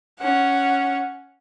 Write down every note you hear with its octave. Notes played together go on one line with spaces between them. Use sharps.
C#4 F#5